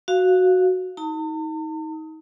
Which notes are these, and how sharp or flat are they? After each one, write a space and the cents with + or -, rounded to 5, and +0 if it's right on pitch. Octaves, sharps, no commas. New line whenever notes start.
F#4 +0 F5 +0
D#4 +30 A5 +45